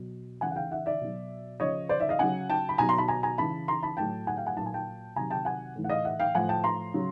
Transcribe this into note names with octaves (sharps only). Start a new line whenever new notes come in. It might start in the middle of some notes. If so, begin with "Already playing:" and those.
Already playing: B2 F#3
C#3 E3 F#5 G#5
F#5
F5 G5
E5 F#5
D5 E5
B2 F#3
C#3 F3 C#5 D#5
C5 D5
D5 E5
D#5 F5
C#3 F#3 F#5 G#5
G5 A5
B5
B2 F#3 G#5 A#5
A#5 C6
A5 B5
G#5 A#5
G#5 A#5
C#3 E3 A5 B5
A#5 C6
A5 B5
A2 F#3 G5 A5
F#5 G#5
F5 G5
F#5 G#5
A#2 F#3 A5
G#5
G5 A5
C3 D#3 F#3 G#5 A#5
G5 A5
F#5 G#5
A2 E3
F#5
D#5 F5
E5 F#5
F5 G5
A2 F3 F#5 G#5
G5 A5
A#5 C6
C#3 F#3